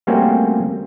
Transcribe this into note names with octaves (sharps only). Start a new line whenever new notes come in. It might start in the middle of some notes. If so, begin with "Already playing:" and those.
G3 A3 A#3 C4 C#4 F#4